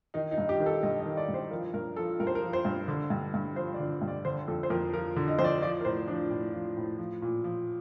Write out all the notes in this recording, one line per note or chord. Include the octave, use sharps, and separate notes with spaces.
D#3 D#4
D#4
G2
G4
D#3
A4
G2 D#5
D#5
D#3
D5
G2
C5
F3 A#4
G2 A#4
F3 A4
G2 A#4
C5
A#4
F3
C5
G2
D3
G2
G2
F3 C5
D5
D3
G2
D5
D3 C5
F2 A4
C5
F2 A#4
F3 A#4
D3
D#5
F2 C5
D5
F3 D5
A#4
A2 C5
F3 D4
A2
F3
A2
F3
A#2
F3